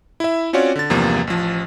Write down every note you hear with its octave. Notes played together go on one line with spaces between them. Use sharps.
E4 E5
C4 C#4 F4 F#4 C#5 D5
D3 A6
E2 G2 C3 F3 A#3
A1 F3